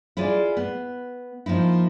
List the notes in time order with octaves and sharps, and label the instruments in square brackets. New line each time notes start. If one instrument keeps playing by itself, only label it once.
[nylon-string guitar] E4 F4 G#4 D5
B3
F3 A#3 D#4 E4